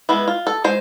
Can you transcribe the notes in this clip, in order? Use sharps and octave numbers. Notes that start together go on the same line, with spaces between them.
G#3 B3 E4
F4
A4
G#3 C5